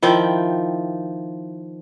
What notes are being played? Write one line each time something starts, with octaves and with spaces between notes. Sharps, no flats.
D#3 F3 E4 G5